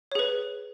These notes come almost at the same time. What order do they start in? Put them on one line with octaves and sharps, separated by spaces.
C#5 G#4 B4